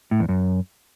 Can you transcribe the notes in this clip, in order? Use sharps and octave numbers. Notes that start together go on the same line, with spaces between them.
A2
E2
F#2